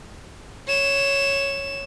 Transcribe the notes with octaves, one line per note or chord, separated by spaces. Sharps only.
C#5 E7